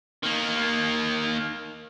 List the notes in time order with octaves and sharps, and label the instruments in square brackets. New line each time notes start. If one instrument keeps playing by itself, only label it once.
[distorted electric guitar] D#3 A#3